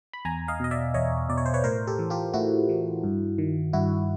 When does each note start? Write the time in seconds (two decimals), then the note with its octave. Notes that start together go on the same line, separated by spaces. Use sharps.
0.13 B5
0.25 E2 G#5 A#5
0.48 D#5 F5
0.60 B2 D#5
0.71 D5 E5
0.94 E2 C#5 D#5
1.29 B2 D5
1.37 C#5
1.46 C5
1.54 B4 C#5
1.64 A2 A#4 C5
1.87 G4 A4
1.99 E3
2.10 F4 G4
2.34 A2 E4 F#4
2.69 E3
3.04 G2
3.38 D#3
3.73 G2 E4 F#4